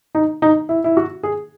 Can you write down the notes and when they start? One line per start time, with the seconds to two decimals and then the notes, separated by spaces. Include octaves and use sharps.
0.15 D#4
0.42 D#4
0.69 E4
0.84 E4
0.97 F#4
1.23 G#4